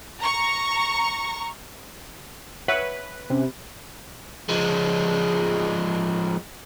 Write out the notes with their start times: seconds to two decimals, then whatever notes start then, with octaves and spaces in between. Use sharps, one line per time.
0.20 A#5 C#6
2.68 B4 C#5 E5 F#5
3.30 C3 C#4
4.49 F3 G#3